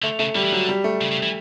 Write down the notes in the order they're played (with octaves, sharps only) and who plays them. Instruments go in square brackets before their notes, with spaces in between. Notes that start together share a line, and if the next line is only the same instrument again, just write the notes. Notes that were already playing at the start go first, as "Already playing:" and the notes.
[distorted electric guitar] D3 [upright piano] A3
[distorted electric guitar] C#3 [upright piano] A3
[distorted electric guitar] D3 [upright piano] G3
[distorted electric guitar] E3
[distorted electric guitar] D3 [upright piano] F#3
[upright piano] G3
A3
[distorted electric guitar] C#3
C#3
E3